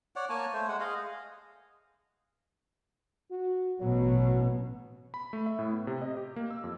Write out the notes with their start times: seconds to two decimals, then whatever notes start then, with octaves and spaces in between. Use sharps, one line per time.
0.16 C#5 D5 F#5
0.29 A#3 C#5 G#5 A5
0.53 A3 C5
0.68 G#3 F#5
0.80 G#4 D#5 F5
3.31 F#4
3.80 A1 B2 F#3
5.14 B5
5.33 A3
5.46 E5
5.59 A2
5.73 B3
5.87 C3
6.02 D#5
6.17 G4
6.36 A#3
6.51 E6
6.64 F2